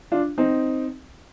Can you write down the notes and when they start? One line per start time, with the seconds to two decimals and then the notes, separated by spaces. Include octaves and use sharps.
0.12 D4 F4
0.38 C4 D#4